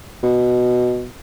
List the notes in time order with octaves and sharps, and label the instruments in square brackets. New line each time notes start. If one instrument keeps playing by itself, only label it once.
[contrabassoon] B2